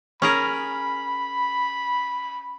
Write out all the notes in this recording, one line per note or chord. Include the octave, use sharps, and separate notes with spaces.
C#4 G#4 A#4 B5